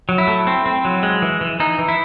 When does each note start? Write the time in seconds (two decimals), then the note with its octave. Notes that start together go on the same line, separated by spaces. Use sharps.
0.09 F#3
0.18 E4
0.27 A3
0.47 C4
0.66 C4
0.85 F#3
1.03 G#3
1.22 E3
1.41 E3
1.60 E3 D#4
1.78 E3
1.88 E4